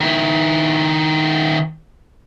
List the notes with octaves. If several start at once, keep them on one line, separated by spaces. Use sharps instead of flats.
D#3 E4